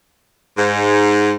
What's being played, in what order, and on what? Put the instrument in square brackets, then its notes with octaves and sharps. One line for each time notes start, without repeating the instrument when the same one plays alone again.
[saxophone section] G#2